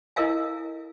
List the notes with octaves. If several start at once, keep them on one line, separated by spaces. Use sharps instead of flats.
E4 A4 A#4 D#5 F5 G#5